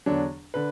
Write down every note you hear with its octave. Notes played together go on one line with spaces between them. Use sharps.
E2 D3 F#3 D4
D3 B4